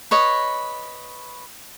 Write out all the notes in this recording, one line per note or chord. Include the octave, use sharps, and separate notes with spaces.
B4 C#5 D#5